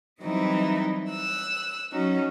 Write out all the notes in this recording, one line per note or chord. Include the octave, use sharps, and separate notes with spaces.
E3 F#3 G3 C4 D#4 E4
E6 F#6
F#3 C#4 D#4 F#4